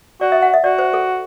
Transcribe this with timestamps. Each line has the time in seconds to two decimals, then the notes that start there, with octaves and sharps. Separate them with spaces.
0.21 F#4 D5
0.32 E5
0.42 F#5
0.54 E5
0.64 F#4 D5
0.79 C5
0.93 A4